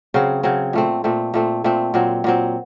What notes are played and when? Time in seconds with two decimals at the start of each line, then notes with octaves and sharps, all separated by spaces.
0.14 C#3 F#3 C4
0.43 C#3 F#3 C4
0.73 A#2 A3 C4
1.04 A#2 A3 C4
1.34 A#2 A3 C4
1.64 A#2 A3 C4
1.94 A#2 F#3 C4
2.24 A#2 F#3 C4